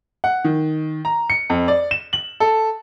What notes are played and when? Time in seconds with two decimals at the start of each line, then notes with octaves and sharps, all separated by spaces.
0.24 F#5
0.44 D#3
1.05 A#5
1.30 C#7
1.50 F2
1.68 D5
1.91 E7
2.13 F#7
2.40 A4